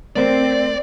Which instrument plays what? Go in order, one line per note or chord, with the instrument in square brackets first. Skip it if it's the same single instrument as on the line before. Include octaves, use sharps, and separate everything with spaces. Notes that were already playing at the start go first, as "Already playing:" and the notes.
[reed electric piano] A3 A#4 C5 [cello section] C4 [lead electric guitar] D5